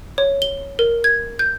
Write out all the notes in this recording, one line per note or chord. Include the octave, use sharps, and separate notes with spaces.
C#5
G7
A#4
G#6
G6